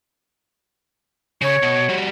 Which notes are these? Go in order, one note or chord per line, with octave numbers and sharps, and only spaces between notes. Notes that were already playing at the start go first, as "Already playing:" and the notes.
C#3 C#5
B2
G3 F#4